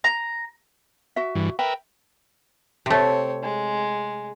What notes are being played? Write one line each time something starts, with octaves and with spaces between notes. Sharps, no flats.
A#5
F#4 E5
G2 E3
A#4 B4 E5 G5
C3 A3 C4 C#5
G#3